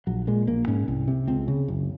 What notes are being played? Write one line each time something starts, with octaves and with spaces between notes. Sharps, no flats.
A#1 F#3
A#2 G#3
A#1 A#3
G#2 C#4
C2
C3
C#2 C4
C#3
F#1